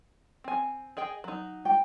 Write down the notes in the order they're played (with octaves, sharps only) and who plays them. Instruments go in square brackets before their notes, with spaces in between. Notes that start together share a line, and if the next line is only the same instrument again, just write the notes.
[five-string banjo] C4 G#5
G#4 D#5 G5
F#3 D#4
[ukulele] G5